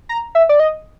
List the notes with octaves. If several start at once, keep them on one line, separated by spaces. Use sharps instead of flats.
A#5
E5
D5
D#5